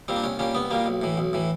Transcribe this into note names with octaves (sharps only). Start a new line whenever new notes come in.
A#2 G3 C4
D4
C2 C#4
A#2 G3 C#4
C2 B3
A#2 G3 A#3
B1
A2 E3
B1
A2 E3